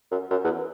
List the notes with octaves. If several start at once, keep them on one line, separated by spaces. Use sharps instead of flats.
F#2
F#2
E2